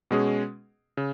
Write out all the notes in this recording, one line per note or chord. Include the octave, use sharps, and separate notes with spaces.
B2 G#3 C#4 G#4
C#3